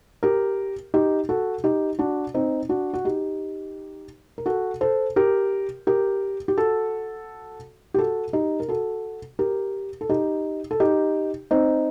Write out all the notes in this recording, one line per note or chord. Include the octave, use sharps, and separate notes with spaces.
G4 A#4
D#4 G4
F#4 A4
D#4 G4
D4 F#4
C4 D#4
D4 F#4
F#4
D#4 G4
A#4
F#4 A4
A4 C5
G4 A#4
G4 A#4
G4
F#4 A4
G4
F#4 A4
D#4 G4
A#4
F#4 A4
G4 A#4
A4
D#4 G4
A4
D#4 G4
C4 D#4